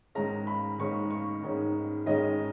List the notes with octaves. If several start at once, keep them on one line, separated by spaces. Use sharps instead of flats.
G#2 D#3 G#3 C#4 A#5
B5
G#2 D#3 G#3 C#4 C#6
C#6
G#2 D#3 G#3 C#4
G#2 D#3 G#3 C#4 D#5